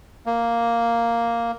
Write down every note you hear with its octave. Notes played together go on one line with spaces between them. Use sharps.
A#3